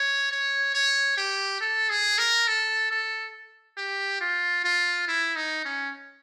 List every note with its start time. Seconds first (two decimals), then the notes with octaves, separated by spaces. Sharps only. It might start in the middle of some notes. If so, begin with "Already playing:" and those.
Already playing: C#5
0.31 C#5
0.74 C#5
1.17 G4
1.61 A4
1.90 G#4
2.18 A#4
2.47 A4
2.91 A4
3.77 G4
4.21 F4
4.64 F4
5.08 E4
5.36 D#4
5.65 C#4